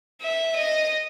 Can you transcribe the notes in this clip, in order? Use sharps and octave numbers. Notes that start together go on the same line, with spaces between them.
E5
D#5